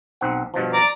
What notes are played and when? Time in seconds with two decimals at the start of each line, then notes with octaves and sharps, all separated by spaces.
0.21 B1 C4 F#5
0.54 G2 B2 F3
0.73 D5 A#5